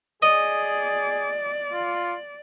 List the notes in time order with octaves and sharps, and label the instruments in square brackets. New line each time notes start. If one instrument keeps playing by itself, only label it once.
[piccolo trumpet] G#4 [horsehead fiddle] D5 [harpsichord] D#5
[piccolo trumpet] F4